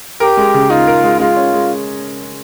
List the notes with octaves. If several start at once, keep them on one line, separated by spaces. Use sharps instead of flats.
G4 A#4
G#3
C#3
D#4 F4
A#4
G#3
G#3 F4
C#4
G#3